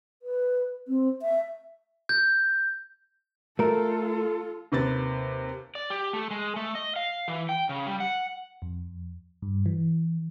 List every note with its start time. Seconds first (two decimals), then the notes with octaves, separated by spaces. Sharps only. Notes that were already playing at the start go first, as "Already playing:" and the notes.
0.22 B4
0.88 C4
1.22 E5
2.09 G6
3.59 A3 F4 A4 A#4
4.72 D#2 C3 B4 A6
5.75 D5
5.90 G4
6.13 A3
6.31 G#3
6.56 A3
6.75 D#5
6.96 F5
7.28 E3
7.49 G5
7.69 C#3
7.86 G3
8.00 F#5
8.62 F2
9.42 G2
9.66 E3